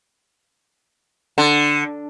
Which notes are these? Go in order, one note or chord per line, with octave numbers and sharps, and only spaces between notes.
D3